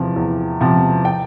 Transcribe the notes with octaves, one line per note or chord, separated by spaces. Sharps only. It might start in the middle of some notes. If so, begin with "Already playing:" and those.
Already playing: E2 C3 F3
E2
C3 F3
G5